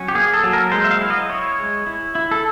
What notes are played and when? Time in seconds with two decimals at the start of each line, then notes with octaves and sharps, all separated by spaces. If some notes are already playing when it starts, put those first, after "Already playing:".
Already playing: F#3 C#4
0.08 G4
0.15 A#3 G#4
0.34 A4
0.43 F#3
0.53 A#4
0.72 G#3 C5
0.84 E5
0.91 F5
1.01 E4
1.10 D#5
1.30 E4 C#5
1.58 G#3
1.87 E4
2.15 E4
2.31 A4